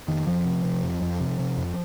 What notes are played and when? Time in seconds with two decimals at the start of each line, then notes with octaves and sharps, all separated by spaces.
0.08 F2 D#3
0.27 F2 F3
0.45 C3
0.64 C3
0.83 F2
1.02 F2
1.20 C3
1.39 C3
1.58 F2